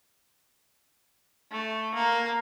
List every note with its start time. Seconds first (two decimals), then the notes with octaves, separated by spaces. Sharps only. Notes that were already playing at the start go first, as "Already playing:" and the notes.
1.51 A3
1.94 A#3